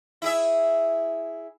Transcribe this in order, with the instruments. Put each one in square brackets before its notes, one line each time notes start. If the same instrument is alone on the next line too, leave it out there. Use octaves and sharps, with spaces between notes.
[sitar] E4 G#4 E5